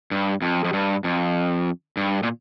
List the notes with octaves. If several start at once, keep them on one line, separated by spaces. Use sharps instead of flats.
G2
F2
F2
G2
F2
G2
A#2